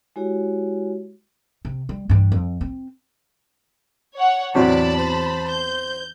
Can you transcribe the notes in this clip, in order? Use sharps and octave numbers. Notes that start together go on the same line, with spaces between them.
G#3 E4 F#4 G4 C#5
C3
G3
G2 E3
F2
C4
C#5 F#5
E2 A2 C3 F#3 D5 A5 B5
C5
G6